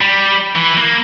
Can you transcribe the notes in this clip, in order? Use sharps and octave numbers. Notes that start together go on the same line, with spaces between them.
G3
E3
A#3